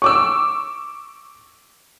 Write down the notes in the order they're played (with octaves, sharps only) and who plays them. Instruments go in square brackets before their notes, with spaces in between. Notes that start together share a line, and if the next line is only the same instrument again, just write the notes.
[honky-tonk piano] C#6 D6 E6